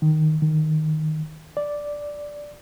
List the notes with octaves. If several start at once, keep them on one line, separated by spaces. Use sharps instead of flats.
D#3
D#3
D5